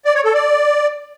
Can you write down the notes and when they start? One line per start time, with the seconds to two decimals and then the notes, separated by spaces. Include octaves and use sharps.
0.05 D5
0.15 C#5
0.25 A4
0.34 D5